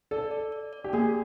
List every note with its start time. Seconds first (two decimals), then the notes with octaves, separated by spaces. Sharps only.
0.11 A4 D5
0.31 D5
0.52 D5
0.73 D5
0.84 G4
0.93 A#3 G#4